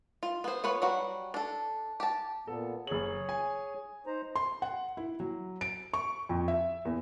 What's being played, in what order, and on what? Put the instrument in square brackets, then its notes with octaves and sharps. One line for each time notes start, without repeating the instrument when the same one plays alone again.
[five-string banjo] F4
B3 C5
B3 F4 B4 C#5
F#3 G3 F#4
D4 A4
G4 A5
[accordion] A#2 B3 [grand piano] A4
[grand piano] F#1 F#7 [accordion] G#4 C#5
[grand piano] G#5
[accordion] D#4 C5 A#5
[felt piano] C6
F#5
E4
F#3
D7
C#6
F2
E5
E2